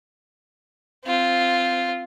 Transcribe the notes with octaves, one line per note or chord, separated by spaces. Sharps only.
C4 F4